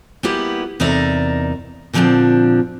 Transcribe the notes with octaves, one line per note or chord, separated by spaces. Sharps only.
G3 A#3 B3 E4 G4
E2 C3 D#4 A#4 D5 E5
A#2 D3 F3 B3 C4 D4